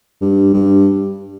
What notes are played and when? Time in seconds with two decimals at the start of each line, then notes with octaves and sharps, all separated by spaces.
0.21 G2
0.53 G2